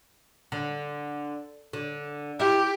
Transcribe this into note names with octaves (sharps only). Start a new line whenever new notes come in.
D3
D3
E4 F4 G4